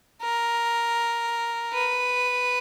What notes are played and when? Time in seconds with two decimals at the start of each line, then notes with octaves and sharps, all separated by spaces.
0.22 A#4
1.73 B4